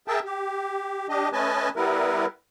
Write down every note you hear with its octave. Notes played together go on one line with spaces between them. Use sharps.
G#4 A#4 E5 G5 A5
G4
D4 G4 D#5
A3 C#4 B4 D#5 G#5 A5
G3 B3 E4 A#4 B4